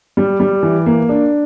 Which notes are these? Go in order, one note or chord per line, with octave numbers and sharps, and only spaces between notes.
G3
G3
E3
A#3
D4